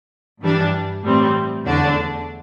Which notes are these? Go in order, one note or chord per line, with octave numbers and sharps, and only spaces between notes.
G2 E3 G3 D4
A2 E3 G3 C4
E2 D3 A3 D4